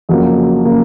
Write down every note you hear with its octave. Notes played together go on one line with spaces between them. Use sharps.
F2 C#3 F#3 A#3
C#3 F#3 A#3